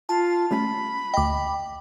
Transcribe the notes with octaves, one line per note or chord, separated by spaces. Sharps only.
F4 A5
G3 A3 C#4 B5
D2 D#5 G5 D6